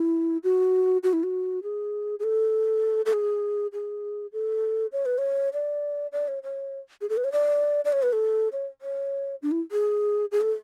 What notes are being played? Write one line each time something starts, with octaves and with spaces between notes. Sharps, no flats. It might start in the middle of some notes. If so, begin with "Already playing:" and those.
Already playing: E4
F#4
F#4
E4
F#4
G#4
G#4
A4
A4
G#4
G#4
A4
C#5
B4
C#5
D5
D5
C#5
C#5
G#4
A4
B4
C#5
D5
D5
C#5
B4
A4
C#5
C#5
D4
E4
G#4
G#4
A4